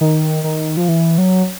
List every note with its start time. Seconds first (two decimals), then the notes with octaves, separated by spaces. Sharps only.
0.01 D#3
0.44 D#3
0.77 F3
0.88 E3
1.18 F#3